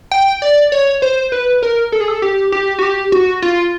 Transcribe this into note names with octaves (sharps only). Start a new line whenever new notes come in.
G5
D5
C#5
C5
B4
A#4
A4
G#4
A4
G4
G4
F#4
G4
F#4
F4